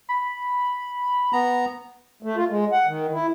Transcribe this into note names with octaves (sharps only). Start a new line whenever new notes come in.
B5
B3 A#5
A3
F4
G#3
F#5
D#3
E4